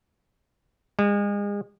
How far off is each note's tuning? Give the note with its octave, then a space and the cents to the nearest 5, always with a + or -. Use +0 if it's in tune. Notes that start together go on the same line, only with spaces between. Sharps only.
G#3 -35